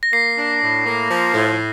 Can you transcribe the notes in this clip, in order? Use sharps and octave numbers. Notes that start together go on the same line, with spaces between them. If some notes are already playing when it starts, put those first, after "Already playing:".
A#6
A#3 C7
D4
A2
A#3
F3
A2